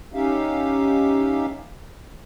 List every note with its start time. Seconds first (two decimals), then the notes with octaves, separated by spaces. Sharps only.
0.14 C#4 D#4 G4 E5 F5